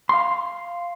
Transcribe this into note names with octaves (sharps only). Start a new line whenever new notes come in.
F5 C6